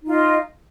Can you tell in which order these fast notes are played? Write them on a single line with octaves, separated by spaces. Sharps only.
D#4 F4 D#5